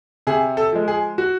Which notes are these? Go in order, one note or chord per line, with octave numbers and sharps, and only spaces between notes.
C3 G#4
A4
F3 G#3
G#4
F#4